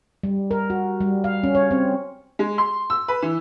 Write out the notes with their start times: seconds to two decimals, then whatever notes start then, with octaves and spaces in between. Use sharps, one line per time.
0.23 G3
0.51 A#4
0.70 F#4
1.00 G3
1.24 F5
1.44 C#4
1.55 C#5
1.71 C4
2.39 G#3
2.58 C6
2.90 E6
3.08 B4
3.22 E3